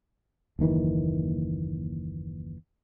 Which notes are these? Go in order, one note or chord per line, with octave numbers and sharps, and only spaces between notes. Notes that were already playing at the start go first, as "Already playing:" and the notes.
F#1 D#2 D#3 E3